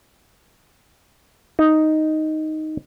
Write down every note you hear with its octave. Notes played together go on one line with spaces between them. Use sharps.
D#4